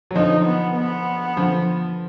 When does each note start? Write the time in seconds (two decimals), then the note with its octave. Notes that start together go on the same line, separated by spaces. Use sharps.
0.11 F#3
0.15 D3 F3 D#4
0.46 B3
0.76 B3
1.37 D3 F3